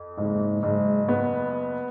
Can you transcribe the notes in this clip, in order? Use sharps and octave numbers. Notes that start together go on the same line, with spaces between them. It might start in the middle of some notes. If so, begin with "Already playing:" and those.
Already playing: F2
F#1 G#2
F#1 G#2
B3